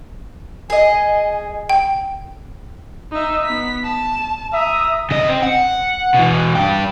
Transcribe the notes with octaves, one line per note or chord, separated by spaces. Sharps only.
G#4 D#5 G#5
G5
D#4 E5
B3 B6
A5
E5 A#5 D#6
C#3 D#5
C4
F#5
B2 E3
D4 G4